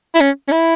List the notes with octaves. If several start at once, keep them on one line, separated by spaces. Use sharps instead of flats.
E4
C#4
C#4
E4